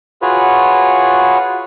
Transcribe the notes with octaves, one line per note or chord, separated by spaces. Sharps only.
F4 F#4 G#4 B4 C#5